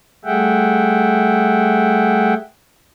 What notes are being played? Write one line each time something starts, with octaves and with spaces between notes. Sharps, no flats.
G3 A3 G#4 E5 F#5 G5